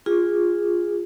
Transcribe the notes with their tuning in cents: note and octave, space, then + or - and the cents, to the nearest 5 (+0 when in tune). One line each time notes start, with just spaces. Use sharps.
F4 +0 G#4 -15